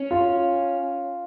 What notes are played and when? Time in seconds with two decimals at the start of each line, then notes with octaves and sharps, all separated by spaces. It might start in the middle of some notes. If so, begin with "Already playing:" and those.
Already playing: C#4
0.11 F4